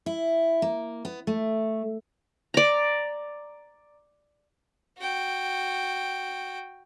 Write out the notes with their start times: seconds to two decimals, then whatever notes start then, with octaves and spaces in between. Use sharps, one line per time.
0.06 E4
0.62 A#3
1.05 B3
1.27 A3
2.54 D5 A#5
4.99 F#4 G5